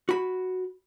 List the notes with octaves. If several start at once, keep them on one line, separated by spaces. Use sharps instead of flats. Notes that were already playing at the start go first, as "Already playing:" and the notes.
F#4 B5